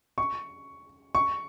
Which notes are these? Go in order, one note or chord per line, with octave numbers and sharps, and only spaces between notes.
C#6
C#6